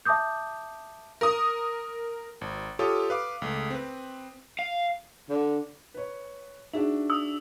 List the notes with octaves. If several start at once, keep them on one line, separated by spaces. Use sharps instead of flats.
E5 A5 D6 D#6 G6
A#4 D#6
G#1
F4 G4 A4 C#5 D#6
B4 F5 D6
C#2 A3
C4 B4
F5
D3
B4 C#5
D4 D#4 F#4 G#4 E5
D#6 E6